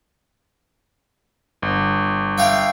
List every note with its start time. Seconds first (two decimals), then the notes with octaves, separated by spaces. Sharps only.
1.62 G1
2.38 E5 F5 G5